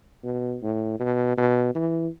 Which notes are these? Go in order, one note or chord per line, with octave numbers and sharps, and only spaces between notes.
B2
A2
B2
B2
E3